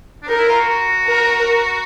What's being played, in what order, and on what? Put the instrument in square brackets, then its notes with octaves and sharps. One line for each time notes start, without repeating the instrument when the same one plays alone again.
[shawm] D4
[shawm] D#4 [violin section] A#4
[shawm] E4
F4
F#4
F#4
[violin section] A#4